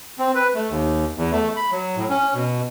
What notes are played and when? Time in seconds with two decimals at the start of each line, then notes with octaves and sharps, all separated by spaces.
0.19 C4
0.35 B4
0.55 A3
0.70 D#2
1.16 E2
1.32 A3
1.56 B5
1.72 F#3
1.96 A2
2.10 C#4
2.34 B2